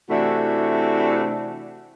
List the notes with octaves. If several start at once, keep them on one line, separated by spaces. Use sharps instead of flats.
C3 E3 A3 D4 E4 F#4